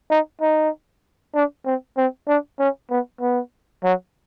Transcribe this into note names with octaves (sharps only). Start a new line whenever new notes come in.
D#4
D#4
D4
C4
C4
D4
C#4
B3
B3
F#3